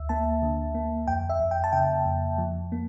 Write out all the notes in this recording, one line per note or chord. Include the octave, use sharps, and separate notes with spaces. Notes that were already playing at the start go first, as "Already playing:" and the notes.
Already playing: D2 E5
A#3 A5
D3
A#3
F2 G5
E5
F2
G5
A5
C#3 G5
F2
F3
A#3